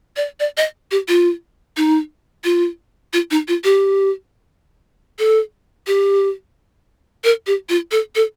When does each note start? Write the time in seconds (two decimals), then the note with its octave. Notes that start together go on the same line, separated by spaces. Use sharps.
0.16 D5
0.40 D5
0.57 D#5
0.91 G4
1.08 F4
1.77 D#4
2.44 F4
3.13 F4
3.31 D#4
3.48 F4
3.64 G4
5.19 A4
5.87 G4
7.24 A#4
7.47 G4
7.69 F4
7.92 A4
8.15 A4